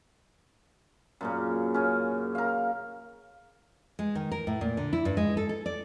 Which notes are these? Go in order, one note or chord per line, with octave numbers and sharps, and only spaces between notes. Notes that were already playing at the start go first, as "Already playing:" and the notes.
F#2 A#2 C#3
C#3 C#4
A#4 F5
G#3
D#3
A#4
A2
A#2
D3
E4
G2
G#3
A4
A4
D5